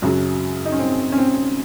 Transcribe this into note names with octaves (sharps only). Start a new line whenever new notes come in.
F#2 C#3 F#3 F#4
D#4
C#4
C4
C#4
C4